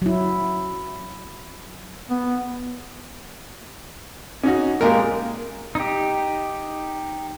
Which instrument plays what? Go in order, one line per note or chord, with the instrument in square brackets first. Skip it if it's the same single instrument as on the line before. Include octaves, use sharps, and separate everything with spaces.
[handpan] F#3 E4
[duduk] B3
[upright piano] C#4 D#4 F#4
[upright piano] A#2 A#3 G4 [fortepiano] G#3 A#4
[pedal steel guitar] D#4 G4